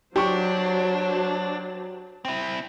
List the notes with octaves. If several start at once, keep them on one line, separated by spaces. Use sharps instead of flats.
F#3 D4 G4 C5 C#6
C4 E4